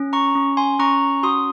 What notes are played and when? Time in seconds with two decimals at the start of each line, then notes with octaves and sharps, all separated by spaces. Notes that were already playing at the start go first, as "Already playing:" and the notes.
Already playing: C#4
0.13 A#5 C#6
0.35 C#4
0.57 G#5 C6
0.79 C#4 A#5 C#6
1.23 F#4 C6 D#6